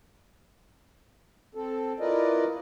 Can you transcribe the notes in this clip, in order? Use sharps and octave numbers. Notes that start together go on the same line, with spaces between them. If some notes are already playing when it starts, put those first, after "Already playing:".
C4 A4
E4 F4 A#4 B4 D5 D#5